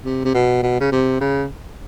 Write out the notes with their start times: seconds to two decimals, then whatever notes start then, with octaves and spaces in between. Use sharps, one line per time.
0.05 C3
0.25 C3
0.34 B2
0.63 B2
0.80 C#3
0.92 C3
1.21 C#3